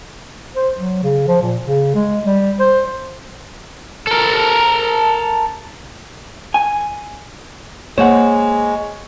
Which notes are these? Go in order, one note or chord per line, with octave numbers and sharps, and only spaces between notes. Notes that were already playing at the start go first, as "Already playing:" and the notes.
C5
F#3
C#3
F3
A#2
C#3
G#3
G3
C5
A4 A#4
G#5
G#3 A#3 C5 C#5 F#5